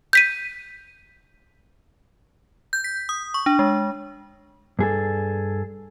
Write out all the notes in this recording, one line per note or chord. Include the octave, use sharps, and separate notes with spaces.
G6 B6 D#7
G6
B6
D#6
C#6
D4
G#3
G2 G#4 A4